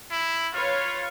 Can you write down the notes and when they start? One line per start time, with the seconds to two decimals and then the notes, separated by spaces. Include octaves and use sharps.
0.12 E4
0.54 F4 B4 C#5 F5